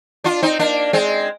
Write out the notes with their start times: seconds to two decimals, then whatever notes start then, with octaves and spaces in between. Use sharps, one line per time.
0.24 D4 F4
0.42 C4 D#4
0.59 A#3 D4
0.93 G#3 C4